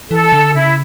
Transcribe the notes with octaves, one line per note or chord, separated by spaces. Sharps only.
E3 A4
D3
C#3 E4